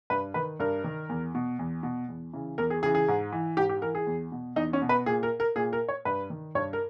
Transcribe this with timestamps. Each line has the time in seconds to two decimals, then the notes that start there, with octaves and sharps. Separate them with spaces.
0.10 G2 B4
0.34 D#3 B4
0.59 G2 A#4
0.84 D#3
1.09 E2
1.35 B2
1.59 E2
1.83 B2
2.08 E2
2.33 C#3 E3
2.58 E2 A#4
2.70 G#4
2.82 C#3 G#4
2.86 E3
2.95 G#4
3.08 G#2
3.32 E3
3.57 G#2 G4
3.69 G4
3.81 E3 A#4
3.95 G#4
4.07 E2
4.32 B2
4.56 E2 D#4
4.73 C#4
4.82 B2
4.89 B4
5.06 A#2 G#4
5.23 A#4
5.40 A#4
5.56 A#2 G#4
5.73 A#4
5.88 C#5
6.05 G2 B4
6.30 D#3
6.55 G2 C#5
6.73 A#4